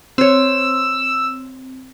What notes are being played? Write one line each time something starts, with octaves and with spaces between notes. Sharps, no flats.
C4 C5 C#5 E6